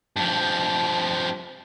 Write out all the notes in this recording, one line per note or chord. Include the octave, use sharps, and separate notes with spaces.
G2 F3